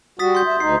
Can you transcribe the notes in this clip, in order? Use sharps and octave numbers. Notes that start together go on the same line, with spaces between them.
G3 F#4 D#6 A6 B6
C6 G6
E5
D2 D#4 C7